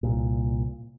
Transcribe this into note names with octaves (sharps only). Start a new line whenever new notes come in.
C2 A#2